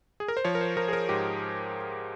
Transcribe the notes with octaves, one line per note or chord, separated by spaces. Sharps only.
G#4
A#4
C5
F3 C#5
A#4
C5
F3 A#4
G#4
A#4
G#2 G4